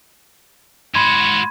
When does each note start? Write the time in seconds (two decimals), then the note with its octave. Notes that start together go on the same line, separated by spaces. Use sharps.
0.95 G#2 F#4 B5 C6 G#6